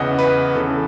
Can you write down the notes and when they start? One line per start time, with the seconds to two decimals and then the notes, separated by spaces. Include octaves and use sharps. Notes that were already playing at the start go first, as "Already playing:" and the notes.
Already playing: E2 C#3 E3 D#5 F#5
0.19 B4
0.55 E2 C#3 E3 A4